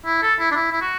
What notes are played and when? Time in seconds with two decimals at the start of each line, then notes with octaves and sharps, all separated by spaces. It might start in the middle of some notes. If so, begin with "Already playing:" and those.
0.06 E4
0.22 A4
0.39 E4
0.52 D4
0.56 E4
0.72 E4
0.81 F#4